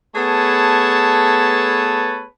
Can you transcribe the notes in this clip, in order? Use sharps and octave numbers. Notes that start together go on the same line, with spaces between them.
A3 B3 G#4 B4 C#5 A5